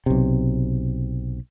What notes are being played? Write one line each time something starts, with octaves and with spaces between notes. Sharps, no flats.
B1 C3